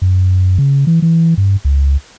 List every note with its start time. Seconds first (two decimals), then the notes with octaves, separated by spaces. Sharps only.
0.02 F#2
0.58 C#3
0.87 E3
1.02 E3
1.38 G2
1.65 C#2